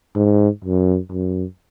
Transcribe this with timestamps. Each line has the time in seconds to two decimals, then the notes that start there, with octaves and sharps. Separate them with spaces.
0.15 G#2
0.64 F#2
1.11 F#2